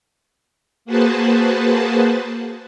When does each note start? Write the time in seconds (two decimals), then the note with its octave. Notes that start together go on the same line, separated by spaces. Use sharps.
0.85 A#3 F#4 G#4 B4 C5 A5